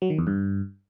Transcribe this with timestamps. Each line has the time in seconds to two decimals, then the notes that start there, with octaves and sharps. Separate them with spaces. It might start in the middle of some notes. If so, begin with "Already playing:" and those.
0.02 F#3
0.10 D#3
0.18 E2
0.27 G2